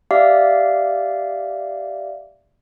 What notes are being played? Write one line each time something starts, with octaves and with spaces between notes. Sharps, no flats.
G4 D5 E5 F5